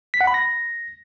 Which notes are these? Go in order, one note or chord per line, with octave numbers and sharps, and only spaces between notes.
B6
F#5
B5
A#6